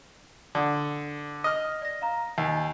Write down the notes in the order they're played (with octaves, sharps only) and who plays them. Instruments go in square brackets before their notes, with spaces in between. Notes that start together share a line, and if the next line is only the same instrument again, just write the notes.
[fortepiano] D3 [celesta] D5 D#6
[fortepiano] D#5 F6
[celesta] D5 A#6
F5 A#5 A#6
[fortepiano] D#2 [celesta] G#5 C7